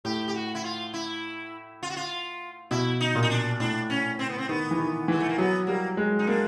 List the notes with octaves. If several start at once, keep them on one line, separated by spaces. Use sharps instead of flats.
A2 G4
G4
F#4
E4
F4
E4
F4
F#4
F4
B2 E4
D#4
A#2
D#4
D4
A2 D4
C#4
C4
B3
C4
D#3 B3
E3
D#3
E3 G#3
A3
A#3
F#3 B3
G3 A#3
G#3
D#4
A#3 D4